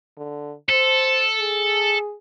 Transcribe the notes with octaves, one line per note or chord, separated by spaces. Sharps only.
D3
A4 C5
G#4